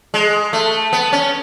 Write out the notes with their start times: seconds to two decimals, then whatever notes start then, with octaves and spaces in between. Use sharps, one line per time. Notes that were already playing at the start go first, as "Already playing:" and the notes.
0.14 G#3
0.53 A3
0.93 B3
1.13 C#4